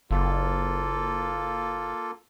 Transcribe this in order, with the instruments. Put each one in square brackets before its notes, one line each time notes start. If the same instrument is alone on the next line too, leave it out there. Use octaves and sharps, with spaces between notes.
[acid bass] F#1 [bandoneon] A#3 F4 A4